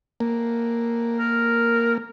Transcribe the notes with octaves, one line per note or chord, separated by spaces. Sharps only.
A#3
A#4